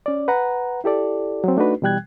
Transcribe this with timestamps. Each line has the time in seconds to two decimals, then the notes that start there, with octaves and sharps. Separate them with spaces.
0.06 C#4 D5
0.28 B4 F#5 A#5
0.84 E4 G4 A4 D5
1.44 F#3 C4
1.57 A3 D4 D#4 F#4 B4
1.82 B2 E3 G3 G5 F#6 G#6